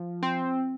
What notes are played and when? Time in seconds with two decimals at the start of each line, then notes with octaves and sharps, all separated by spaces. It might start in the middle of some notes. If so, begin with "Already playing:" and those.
Already playing: F3
0.23 C4